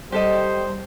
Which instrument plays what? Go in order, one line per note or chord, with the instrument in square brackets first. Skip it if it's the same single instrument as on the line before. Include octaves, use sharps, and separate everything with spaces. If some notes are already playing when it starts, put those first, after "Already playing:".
[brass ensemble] G3 [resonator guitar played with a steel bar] G4 A4 D#5 [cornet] C5